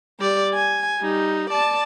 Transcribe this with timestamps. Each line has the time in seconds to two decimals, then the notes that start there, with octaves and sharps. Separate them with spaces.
0.20 G3 D5
0.54 G#5
1.00 G3 D#4
1.50 D5 A5